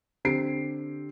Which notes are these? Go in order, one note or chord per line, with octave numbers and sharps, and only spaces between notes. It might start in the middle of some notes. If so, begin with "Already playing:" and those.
D3 C4 G4 C7 D7